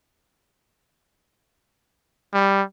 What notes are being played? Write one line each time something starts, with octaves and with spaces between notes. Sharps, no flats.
G3